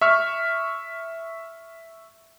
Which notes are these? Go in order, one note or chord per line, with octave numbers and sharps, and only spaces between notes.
E5 C#6 F6